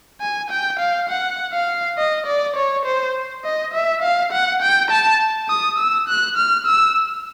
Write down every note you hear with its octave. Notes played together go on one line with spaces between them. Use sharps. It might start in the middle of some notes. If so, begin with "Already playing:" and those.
G#5
G5
F5
F#5
F5
D#5
D5
C#5
C5
D#5
E5
F5
F#5
G5
A5
D#6
E6
F#6
F6
E6